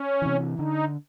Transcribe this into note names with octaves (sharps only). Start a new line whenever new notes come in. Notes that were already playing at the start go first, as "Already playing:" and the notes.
Already playing: C#4
C3 E3
D3 D#4